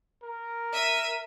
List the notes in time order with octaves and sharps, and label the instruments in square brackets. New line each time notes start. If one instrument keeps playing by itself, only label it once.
[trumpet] A#4
[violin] E5 D#7